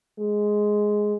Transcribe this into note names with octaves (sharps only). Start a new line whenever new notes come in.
G#3